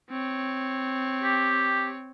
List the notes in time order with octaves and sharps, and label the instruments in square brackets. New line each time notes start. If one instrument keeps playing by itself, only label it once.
[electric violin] C4 C#5
[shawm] G4